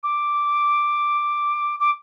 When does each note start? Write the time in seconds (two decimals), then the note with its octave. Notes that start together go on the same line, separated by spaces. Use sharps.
0.03 D6
1.80 D6